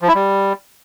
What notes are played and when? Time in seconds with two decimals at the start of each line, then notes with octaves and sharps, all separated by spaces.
0.02 F3
0.08 E4
0.15 G3